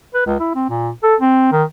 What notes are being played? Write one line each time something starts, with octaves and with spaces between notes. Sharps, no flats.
B4
C#2
E4
C4
A#2
A4
C4
D#3